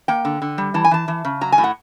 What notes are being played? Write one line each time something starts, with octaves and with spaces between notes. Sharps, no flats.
A#3 G5
D3
D3
G3
E3 A5
G#5
E3 A5
E3
C#3
F#3 A#5
G#5
A2
F#5